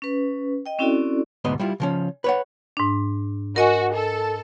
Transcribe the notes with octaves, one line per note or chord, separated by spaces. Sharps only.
C#4 B4
D#5 G5
C4 C#4 E4 F#4 A4 D5
D2 G#2 B2 B3 D#5
G3 E4 F4
C#3 F3 C#4
B4 C#5 F#5
G#2 D4
F#4 A#4 D#5 G#5
A4